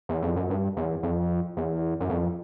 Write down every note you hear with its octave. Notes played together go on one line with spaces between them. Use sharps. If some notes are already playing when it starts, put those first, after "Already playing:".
E2
F2
F#2
G2
E2
F2
E2
F#2
F2